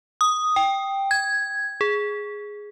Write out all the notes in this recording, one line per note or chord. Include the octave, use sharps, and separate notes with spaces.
D#6
G5
G#6
G#4